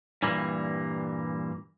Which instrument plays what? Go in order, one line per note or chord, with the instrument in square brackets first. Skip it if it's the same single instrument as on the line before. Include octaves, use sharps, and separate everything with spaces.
[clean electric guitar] G2 A#2 E3 G3 A#3